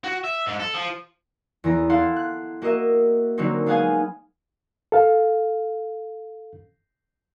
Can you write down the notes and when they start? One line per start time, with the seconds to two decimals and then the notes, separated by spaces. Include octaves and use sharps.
0.04 F#4
0.24 E5
0.47 G#2
0.59 A4
0.74 F3
1.64 E2 E3 B3 A#5
1.89 E4 A4 F5 F#5 C6
2.16 F#6
2.62 A#3 F#4 A#4 D#5 E5
3.38 D3 F#3 A#3 C4 C#4 D#4
3.66 G#3 B3 F5 F#5 G#5 D#6
4.92 A4 F5